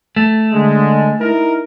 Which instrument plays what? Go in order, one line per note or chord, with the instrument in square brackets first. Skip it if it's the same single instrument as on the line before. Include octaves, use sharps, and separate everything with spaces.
[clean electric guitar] A3
[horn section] D3 G#3
D#4 E4 A#4